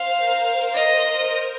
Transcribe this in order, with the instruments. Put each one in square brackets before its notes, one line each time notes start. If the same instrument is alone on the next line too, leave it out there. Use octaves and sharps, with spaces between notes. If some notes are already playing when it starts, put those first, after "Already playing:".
Already playing: [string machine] C5 [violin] F5
[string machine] A#4
[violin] D#5